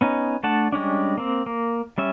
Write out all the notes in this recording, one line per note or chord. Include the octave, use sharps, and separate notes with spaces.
B3 C#4 D#4
A3 D4 F#5 A5
G3 G#3 C#4 D4
A#3 C4
A#3
G3 C#4 E5